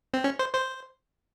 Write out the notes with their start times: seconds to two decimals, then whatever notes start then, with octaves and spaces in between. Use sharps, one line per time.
0.14 C4
0.24 C#4
0.39 C5
0.54 C5